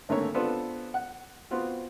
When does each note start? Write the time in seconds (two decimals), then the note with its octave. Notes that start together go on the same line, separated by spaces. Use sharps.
0.09 G#1 D3 A3 A#3 A#4 C#5
0.34 B3 C4 D4 F4 A4 B4
0.94 F#5
1.51 B3 C4 F4 F#4